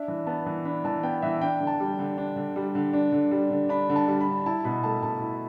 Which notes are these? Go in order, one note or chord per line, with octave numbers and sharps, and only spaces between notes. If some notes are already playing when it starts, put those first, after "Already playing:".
Already playing: D4 E5
E3
B3 A5
E3
D4 B5
E3 A5
B3 G5
E3 E5
D4 G5
D3
A5
G3
D3
D4
D3
G3
D3
D4
D3
G3
D3
D4 B5
D3
A5
G3
B5
D3
E4 A5
B2 B5
A3 A5
B2 A5
E4